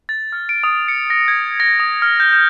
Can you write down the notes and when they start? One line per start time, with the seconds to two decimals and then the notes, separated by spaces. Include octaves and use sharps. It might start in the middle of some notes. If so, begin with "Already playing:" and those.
0.09 A6
0.32 F6
0.49 D7
0.64 D#6
0.88 C#7
1.10 A#6
1.28 G#6
1.60 A#6
1.80 D#6
2.02 F6
2.20 G6
2.33 G6